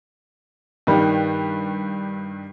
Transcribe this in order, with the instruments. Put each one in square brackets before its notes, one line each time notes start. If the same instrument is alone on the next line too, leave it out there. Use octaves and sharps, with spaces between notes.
[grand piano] G2 D#3 G3